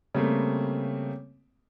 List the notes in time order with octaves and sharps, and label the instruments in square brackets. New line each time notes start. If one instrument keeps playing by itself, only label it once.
[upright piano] C#3 G3 A3 A#3 C4